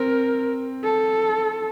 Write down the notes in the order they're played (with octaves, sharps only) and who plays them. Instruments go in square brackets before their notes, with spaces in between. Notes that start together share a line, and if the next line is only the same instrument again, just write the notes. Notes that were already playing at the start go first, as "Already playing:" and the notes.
Already playing: [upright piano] C4 [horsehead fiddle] A#4
[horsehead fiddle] A4